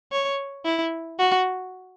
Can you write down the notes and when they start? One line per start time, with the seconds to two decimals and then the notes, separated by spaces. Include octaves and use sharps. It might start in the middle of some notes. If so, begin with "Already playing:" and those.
0.12 C#5
0.65 E4
1.19 F#4